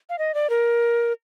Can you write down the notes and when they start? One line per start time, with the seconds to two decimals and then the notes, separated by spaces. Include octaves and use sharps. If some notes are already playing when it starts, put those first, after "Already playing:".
0.10 F5
0.18 D#5
0.34 D5
0.50 A#4